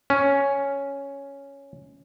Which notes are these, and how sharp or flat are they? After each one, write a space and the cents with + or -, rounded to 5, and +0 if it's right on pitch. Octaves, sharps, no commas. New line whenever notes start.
C#4 +0